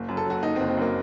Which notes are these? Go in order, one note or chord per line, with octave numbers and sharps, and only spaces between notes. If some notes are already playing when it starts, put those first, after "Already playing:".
Already playing: F#1
F#2
A4
F#3 F#4
F#1 D#4
C4
F#1
C4
F#2 A#3